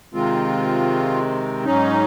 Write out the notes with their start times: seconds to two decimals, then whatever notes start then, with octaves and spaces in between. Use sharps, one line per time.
0.14 C3 D#3 G#3 C4 F4
1.65 G#2 F#3 C#4 D#4